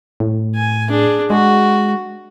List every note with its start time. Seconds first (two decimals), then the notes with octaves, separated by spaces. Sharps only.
0.20 A2
0.56 G#5
0.89 D4 G#4
1.30 G#3 F#4